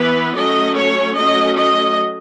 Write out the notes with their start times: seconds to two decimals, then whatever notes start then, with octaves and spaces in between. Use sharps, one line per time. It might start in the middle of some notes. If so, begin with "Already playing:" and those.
Already playing: E3 B3 B4
0.35 F#3 A3 C#4 D#5
0.75 C#5
1.15 F#3 A3 C#4 D#5
1.56 D#5